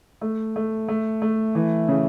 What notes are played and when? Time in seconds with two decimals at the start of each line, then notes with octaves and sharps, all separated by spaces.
0.21 A3
0.56 A3
0.88 A3
1.22 A3
1.55 E3
1.89 C#3